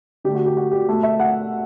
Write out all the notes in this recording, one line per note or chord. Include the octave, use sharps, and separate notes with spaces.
D3 A3 G4
F#4
G4
F#4
G4
B2 A3
E5
F#5